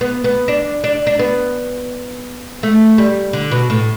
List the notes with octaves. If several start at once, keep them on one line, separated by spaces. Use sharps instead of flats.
B3
B3
D4
D4
D4
B3
A3
G3
D3
B2
A2